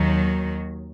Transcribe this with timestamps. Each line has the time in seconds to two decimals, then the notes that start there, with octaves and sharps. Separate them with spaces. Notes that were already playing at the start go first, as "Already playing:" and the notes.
Already playing: D#2 D#3 F#3